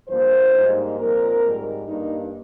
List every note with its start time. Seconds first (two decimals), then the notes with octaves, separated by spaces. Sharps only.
0.08 G2 F3 A#3 C5
0.53 G#2 G3 A#3 D#4
0.98 A#2 F3 C4 A#4
1.42 G#2 D#3 G3
1.87 G2 G3 A#3 D#4